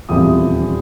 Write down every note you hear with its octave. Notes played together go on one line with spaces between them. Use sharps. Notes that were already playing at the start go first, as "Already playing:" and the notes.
D#1 E2 C3 F3 D#6